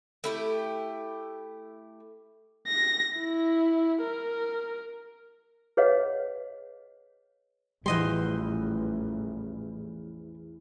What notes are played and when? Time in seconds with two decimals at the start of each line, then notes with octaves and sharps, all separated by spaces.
0.24 A3 E4 G4
2.68 A#6
3.17 E4
4.02 A#4
5.77 G#4 B4 C#5 D#5 F5 F#5
7.86 A1 E2 E3 F3 G3 D#5 C6